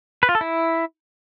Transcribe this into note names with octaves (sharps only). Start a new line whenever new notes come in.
B4
F4
A4
E4